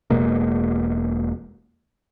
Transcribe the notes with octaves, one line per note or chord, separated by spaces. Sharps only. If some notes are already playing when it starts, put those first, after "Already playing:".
E1 B2 G#3 A#3